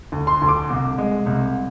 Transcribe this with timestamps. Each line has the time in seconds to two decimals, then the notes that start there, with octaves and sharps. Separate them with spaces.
0.12 D2
0.27 C6
0.42 D2
0.48 D6
0.70 C2
0.98 G#3
1.26 C2